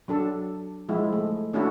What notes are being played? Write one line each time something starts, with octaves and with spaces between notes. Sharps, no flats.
F#3 D4 A4
F3 G#3 E4
A3
A3 C#4 D4 E4 F#4